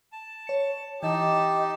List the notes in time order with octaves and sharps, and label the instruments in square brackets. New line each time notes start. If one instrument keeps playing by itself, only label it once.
[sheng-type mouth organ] A5
[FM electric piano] C#5 C#7
[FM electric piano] E3 [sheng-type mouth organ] D#4 A5 [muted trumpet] G4 [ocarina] D#5